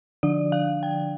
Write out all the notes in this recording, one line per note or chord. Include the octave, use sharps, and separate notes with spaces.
D3 F3 D4 D5
F5
G5